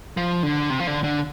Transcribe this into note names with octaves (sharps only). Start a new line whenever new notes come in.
F3
D3
C3
F3
D3
D3